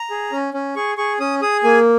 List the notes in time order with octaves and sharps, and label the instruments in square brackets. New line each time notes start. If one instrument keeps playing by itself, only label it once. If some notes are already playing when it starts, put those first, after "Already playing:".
Already playing: [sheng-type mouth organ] A#5
G#4
C#4
C#4
G#4 C#6
G#4 C#6
C#4 D#6
G#4 D#6
A#3 G#5